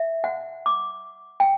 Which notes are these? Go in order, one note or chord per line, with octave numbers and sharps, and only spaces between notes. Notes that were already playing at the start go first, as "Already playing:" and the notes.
Already playing: E5
F#5
D6
G5